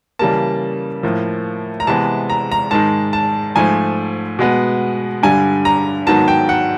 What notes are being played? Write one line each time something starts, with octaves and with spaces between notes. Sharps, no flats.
C#3 E3 G3 A#3 A5
A2 F3 A#3
A#5
C3 E3 G#3 B3 A5
A#5
A#5
G#2 D#3 G#3 A5
A5
G#2 F3 A3 G#5
B2 G#3 B3
G2 D3 G3 G#5
A#5
G#2 D#3 F#3 B3 A5
G5
F#5